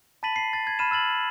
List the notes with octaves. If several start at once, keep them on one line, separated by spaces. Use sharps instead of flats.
A5 B5 A6 B6 D#7 F#7
C7
A6
G#6
B5 F6 D#7 E7
E6 F6 A6 F#7